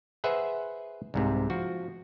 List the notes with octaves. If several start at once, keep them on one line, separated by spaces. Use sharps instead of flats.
G#4 B4 C5 E5 F#5
C2 G#2 C3
F3 F#4